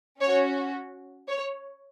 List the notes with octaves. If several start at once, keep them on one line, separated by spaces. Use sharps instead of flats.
C#4 F#4 C#5
C#5